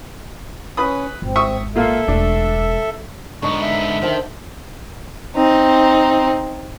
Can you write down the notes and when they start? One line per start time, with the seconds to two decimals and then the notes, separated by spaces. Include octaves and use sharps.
0.77 C#4 B4 B5 D#6
1.22 G#1 C4
1.36 E5 C#6 D#6
1.75 A#2 A#3 F4 A4 E5
2.08 E1 A3 D4
3.42 G#2 D3 B3 D#4 C#6
3.61 E5
4.02 D#3 C5 G5 A5
5.36 C4 D#4